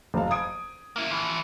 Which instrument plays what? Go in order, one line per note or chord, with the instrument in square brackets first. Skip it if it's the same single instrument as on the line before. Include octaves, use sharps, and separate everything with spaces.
[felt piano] F#1 F2 F5
D#6 G#6 D7
[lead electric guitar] A#3 E4
E3 F3